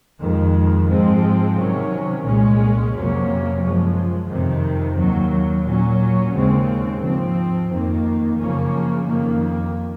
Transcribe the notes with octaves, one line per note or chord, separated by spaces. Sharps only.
F2 D#3 G#3
G#2 F3 G#3 C4
C3 D#3 F#3 C#4
C2 A#2 G#3 C#4
F2 C3 F#3 A#3 C#4
F#2 F3 G#3
F2 C3 D#3
D#2 D#3 F#3
A#2 F#3 C#4
D#2 C#3 G#3 C4
G#2 F3 C4
F2 D#3 A#3
F#2 C#3 F3 A#3 C#4
F2 D#3 A#3